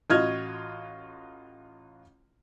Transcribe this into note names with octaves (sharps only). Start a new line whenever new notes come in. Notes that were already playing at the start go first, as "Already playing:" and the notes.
A1 F4 F#4 D#5 F6 G#6